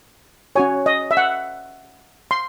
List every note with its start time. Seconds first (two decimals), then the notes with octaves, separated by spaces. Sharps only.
0.56 C#4 F#4 C#5 G#5
0.86 D#5
1.11 E5
1.17 F#5
2.31 C6